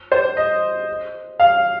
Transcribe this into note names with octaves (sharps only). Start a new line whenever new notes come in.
C5
D#5
F5